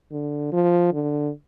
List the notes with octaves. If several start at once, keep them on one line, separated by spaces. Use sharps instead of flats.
D3
F3
D3